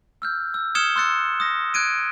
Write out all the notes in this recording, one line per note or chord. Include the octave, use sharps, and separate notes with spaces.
E6 F6 G6
E6
D#6 F6 G#6 C#7 E7 G7
C6 E6 F#6 A6 C#7 G7
D#6 A#6
F#6 G#6 D7 D#7